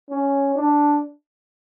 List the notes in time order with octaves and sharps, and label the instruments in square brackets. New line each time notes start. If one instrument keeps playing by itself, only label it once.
[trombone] C#4
D4